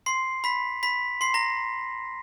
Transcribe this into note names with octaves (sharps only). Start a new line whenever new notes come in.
C6 C7
B5 B6
B5 B6
C6 C7
A#5 A#6